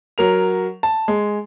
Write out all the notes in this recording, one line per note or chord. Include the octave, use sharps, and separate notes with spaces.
F#3 A#4 F7
A5
G#3